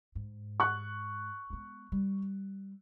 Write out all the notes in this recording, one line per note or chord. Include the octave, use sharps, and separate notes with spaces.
G#2
C#6 F#6
G#3 B3
G3